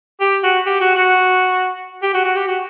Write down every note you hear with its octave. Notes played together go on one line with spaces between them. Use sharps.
G4
F#4
G4
F#4
F#4
G4
F#4
F#4
G4
F#4